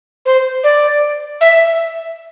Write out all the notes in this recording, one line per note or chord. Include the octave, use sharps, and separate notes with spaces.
C5
D5
E5